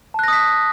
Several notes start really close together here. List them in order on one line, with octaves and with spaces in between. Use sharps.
A5 F#6 A#6 D#6 B6